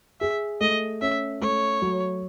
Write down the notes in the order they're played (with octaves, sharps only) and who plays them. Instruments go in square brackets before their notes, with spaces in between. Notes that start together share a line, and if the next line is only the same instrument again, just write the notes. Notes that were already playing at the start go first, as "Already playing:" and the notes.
[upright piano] G#4 [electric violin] E5
[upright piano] A3 [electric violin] D#5
[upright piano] C#4 [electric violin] E5
[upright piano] A3 [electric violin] C#5
[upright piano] F#3